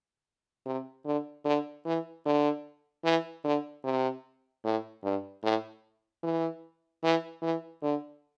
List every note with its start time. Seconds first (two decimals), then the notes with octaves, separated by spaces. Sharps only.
0.66 C3
1.05 D3
1.45 D3
1.86 E3
2.26 D3
3.04 E3
3.44 D3
3.84 C3
4.65 A2
5.04 G2
5.43 A2
6.23 E3
7.03 E3
7.42 E3
7.83 D3